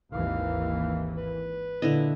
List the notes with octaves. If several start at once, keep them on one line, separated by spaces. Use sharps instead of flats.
G#1 D#2 E3 F5
B4
A#2 D3 E4 D#5